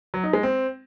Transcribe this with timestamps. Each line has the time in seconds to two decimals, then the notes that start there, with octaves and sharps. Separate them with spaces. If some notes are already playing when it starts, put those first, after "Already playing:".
0.14 F#3
0.24 D#4
0.33 G#3
0.43 C4